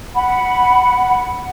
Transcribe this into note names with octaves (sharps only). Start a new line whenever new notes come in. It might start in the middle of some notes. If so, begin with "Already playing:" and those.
F#5 B5